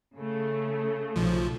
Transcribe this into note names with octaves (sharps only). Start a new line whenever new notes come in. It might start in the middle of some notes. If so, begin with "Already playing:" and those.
C#3 A3
B1 F3